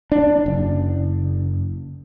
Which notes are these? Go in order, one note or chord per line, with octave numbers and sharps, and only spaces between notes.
D4
F#1